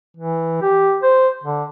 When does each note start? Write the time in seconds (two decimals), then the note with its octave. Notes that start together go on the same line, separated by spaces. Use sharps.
0.17 E3
0.62 G4
1.02 C5
1.44 D3